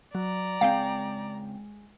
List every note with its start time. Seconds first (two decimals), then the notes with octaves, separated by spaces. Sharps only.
0.15 F#3 D5 A#5
0.61 C#2 G#3 C4 F5 G5